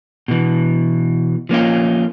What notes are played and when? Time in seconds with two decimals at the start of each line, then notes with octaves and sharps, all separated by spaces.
0.28 B2 E3
1.49 F3 A#3 C#4 F4